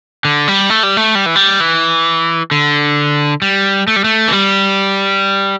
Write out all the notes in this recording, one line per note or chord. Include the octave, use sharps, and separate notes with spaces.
D3
G3
A3
G3
A3
G3
E3
G3
E3
D3
G3
A3
G3
A3
E3
G3